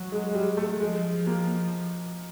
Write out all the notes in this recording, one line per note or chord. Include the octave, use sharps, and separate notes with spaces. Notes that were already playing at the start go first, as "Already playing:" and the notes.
Already playing: F#3
G#3
G#3
G3
A3
F3 G#3
A#3